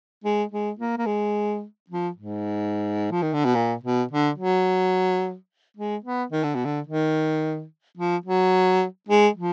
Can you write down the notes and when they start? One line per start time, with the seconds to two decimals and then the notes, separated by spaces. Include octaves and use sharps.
0.24 G#3
0.52 G#3
0.79 A#3
0.98 A#3
1.06 G#3
1.90 F3
2.17 G#2
3.11 F3
3.22 D#3
3.34 D3
3.45 B2
3.55 A#2
3.84 B2
4.11 D3
4.38 F#3
5.77 G#3
6.04 B3
6.32 D#3
6.44 D3
6.55 B2
6.65 D3
6.87 D#3
7.97 F3
8.26 F#3
9.09 G#3
9.36 F3